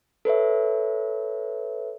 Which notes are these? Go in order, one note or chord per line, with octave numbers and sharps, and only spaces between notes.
A4 B4 C#5 E5